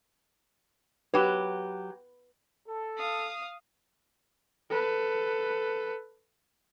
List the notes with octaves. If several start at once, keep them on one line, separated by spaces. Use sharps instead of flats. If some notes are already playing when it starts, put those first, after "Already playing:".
F#3 G4 B4
A4
F5 D#6
A4 B4